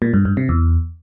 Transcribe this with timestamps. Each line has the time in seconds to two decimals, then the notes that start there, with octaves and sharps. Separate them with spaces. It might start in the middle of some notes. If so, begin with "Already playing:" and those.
0.02 A#2
0.14 G2
0.25 G2
0.37 C3
0.49 E2